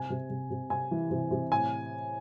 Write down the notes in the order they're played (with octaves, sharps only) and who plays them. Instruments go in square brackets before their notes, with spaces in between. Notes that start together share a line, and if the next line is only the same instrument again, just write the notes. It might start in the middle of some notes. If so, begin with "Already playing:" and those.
Already playing: [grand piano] C3 G#5
C3
C3
C3
C3 G#5
E3
C3
C3
A2 G#5